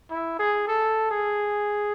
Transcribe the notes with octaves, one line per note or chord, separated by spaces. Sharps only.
E4
G#4
A4
G#4